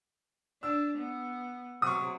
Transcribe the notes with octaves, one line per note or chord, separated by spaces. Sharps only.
D4 E6
B3
C3 F#3 C#6 D#6